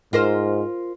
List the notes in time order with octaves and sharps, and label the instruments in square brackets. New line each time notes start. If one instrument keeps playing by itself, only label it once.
[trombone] G#2 [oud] F4 A#4 C5